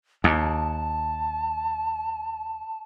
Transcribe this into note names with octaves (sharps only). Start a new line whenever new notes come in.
D#2 A5